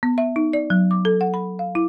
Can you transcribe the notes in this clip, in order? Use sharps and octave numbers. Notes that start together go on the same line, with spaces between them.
B3
E5
D#4
D5
F#3
D6
A4
F#5
B5
F5
E4